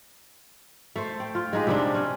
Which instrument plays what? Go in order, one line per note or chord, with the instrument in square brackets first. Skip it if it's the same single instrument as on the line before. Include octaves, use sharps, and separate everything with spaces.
[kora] A3 C5
G5
F4
G#3 D#4 G4
C3 G3 D4
C#4